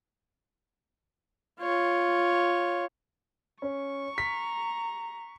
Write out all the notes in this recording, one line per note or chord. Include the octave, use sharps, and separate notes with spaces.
F4 C#5
C#4 C#6
A#5 B6